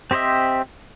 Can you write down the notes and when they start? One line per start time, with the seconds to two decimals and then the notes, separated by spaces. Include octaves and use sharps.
0.11 C4 G4 C5 D#5 E5